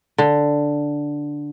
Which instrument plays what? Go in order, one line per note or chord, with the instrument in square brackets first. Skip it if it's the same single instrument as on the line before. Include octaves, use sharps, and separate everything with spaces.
[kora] D3